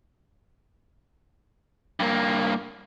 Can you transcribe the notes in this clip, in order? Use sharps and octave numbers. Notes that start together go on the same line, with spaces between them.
G2 A#3